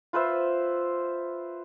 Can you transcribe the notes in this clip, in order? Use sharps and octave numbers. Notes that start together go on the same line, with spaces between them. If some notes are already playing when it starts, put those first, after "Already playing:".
F4 B4 C5 E5